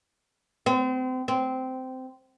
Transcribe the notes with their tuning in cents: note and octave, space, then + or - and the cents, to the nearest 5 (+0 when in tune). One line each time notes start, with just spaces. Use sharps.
C4 -35
C4 -15